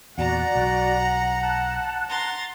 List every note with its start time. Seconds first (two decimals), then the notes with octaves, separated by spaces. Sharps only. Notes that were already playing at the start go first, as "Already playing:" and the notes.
0.18 E2 A#2 F#4 D5 F#5 A#5
0.55 B1
1.40 A5 F#6
2.09 A#5 C6 A6